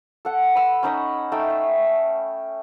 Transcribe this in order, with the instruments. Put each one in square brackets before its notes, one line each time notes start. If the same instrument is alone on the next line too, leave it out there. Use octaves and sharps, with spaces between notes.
[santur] A4 F#5
B5 E6
C#4 D#4 D#5 B5
A3 D#4 G5
E5